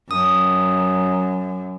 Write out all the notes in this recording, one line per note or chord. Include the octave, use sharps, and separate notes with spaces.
F#2 D#6